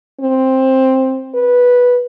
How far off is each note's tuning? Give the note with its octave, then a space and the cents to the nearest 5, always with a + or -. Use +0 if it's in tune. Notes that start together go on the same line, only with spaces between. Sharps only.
C4 +10
B4 -10